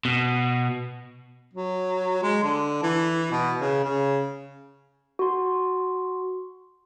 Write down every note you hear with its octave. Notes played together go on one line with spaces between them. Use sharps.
B2
F#3
G#3
D3
E3
B2
C#3
C#3
F#4 C6